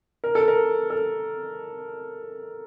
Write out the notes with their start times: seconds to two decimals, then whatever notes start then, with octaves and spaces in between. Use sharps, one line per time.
0.24 A#4
0.35 A4
0.48 A#4
0.90 A4